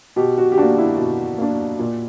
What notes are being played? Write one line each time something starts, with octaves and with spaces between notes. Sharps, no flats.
B2 G4
F#4
G4
A#3 D4 F#4
E4
B2
A#3 D4
A#2